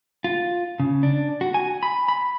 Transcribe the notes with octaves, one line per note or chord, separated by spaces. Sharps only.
F4
C#3
D4
F#4
G#5
B5
B5